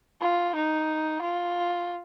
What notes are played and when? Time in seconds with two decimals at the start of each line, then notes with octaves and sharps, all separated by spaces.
0.21 F4
0.55 D#4
1.22 F4